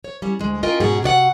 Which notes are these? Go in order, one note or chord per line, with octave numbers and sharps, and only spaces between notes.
C#5
G3 C#4
D2 G#3
C#4 F4 A#4 D#5 G5
G#2 B2 C#4 F#4 G#4
C3 F#4 D5 F#5